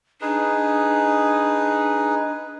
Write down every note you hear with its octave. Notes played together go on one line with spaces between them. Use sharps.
D4 D#4 G#4 B4